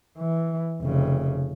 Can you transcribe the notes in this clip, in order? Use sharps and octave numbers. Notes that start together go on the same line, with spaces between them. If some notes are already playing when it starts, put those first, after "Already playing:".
E3
F1 C#3